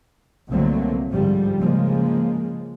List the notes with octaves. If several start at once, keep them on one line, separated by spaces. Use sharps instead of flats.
C2 D3 F#3 A3 A#3 C4
G#2 D3 F3 G3
C#3 F3 G#3 A#3